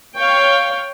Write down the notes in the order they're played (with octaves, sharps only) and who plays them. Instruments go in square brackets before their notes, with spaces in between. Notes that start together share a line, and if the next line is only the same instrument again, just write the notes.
[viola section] C#5 F5 G5